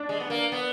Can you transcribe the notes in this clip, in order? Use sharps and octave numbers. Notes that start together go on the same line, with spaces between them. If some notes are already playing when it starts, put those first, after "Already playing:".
Already playing: D4
G#3
B3
A#3
B3